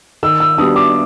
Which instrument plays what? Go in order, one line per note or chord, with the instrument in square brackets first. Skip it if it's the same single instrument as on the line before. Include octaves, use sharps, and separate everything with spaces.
[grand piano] D#3 [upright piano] E6
[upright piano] E6
[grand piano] G3 B3 D4 F#4 [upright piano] D#6
[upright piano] D6